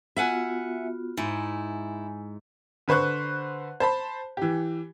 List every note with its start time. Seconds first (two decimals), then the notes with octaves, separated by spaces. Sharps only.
0.16 B3 F4 F#4 E5 F#5 G#5
1.17 G#2 E4 G#5
2.88 D3 B4 C5 C#6 F#6
3.80 C5 A5 B5
4.37 E3 G4